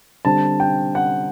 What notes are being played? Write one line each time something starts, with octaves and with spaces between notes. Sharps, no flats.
D3 G3 C4 A5
G5
F#5